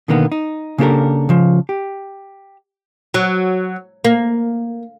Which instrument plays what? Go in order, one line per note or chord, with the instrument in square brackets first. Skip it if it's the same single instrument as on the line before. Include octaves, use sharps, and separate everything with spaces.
[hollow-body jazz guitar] B2 D3 D#3 A#3 B3
D#4
C#3 A#3 D4 G4 A4 A#4
C#3 F3
G4
[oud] F#3
A#3